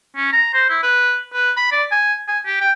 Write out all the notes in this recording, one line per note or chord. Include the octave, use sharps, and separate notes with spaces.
C#4
A#5
C5
E4
B4
B4
B5
D5
G#5
G#5
G4
G5